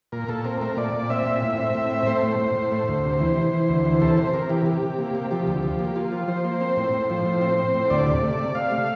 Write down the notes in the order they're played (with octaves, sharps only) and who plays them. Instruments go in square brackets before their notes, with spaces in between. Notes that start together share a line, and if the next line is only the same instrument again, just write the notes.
[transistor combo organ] A#2 A#4
A#2 A4
C4 A#4
A3 A#4
A#2 D5
A#2
C4 E5
A#2
A2
C4
A2
C4
A3 C5
A2
A2
A2
A3
D2
C3
E3
E3
E3
D2
E3
C3 A4
C3 C5
C3 A#4
E3 G4
C3 G4
C3
A#3
C3
F3 G4
D2
F3
A#3
A#3 F4
F3
F3 C5
A#3
C4
A2
A2
F3
A2
C4
C4
A2
D2 D5
C3
A3
C3
C3 F5
A3